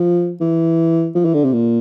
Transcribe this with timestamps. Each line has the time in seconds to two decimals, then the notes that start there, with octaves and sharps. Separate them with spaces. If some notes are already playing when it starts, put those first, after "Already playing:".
Already playing: F3
0.41 E3
1.15 F3
1.25 E3
1.34 D3
1.44 C3
1.53 A#2